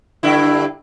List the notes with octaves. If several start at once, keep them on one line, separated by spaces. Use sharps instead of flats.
G2 D3 E4